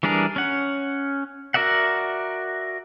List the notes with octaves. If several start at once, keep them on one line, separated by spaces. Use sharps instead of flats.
E3 G3 D4 G#4 A#4
C#4 F#5
F#4 A#4 D5 E5 F#5